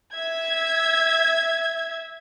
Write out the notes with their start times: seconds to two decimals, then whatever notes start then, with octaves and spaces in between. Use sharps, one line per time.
0.14 E5 G#6